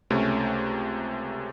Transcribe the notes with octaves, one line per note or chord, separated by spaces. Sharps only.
C#2 C3 A3 C#4